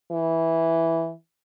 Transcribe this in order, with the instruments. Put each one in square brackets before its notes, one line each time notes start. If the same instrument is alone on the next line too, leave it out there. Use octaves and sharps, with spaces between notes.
[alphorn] E3